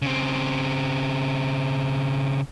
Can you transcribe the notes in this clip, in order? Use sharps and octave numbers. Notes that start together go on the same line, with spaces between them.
C#3 C4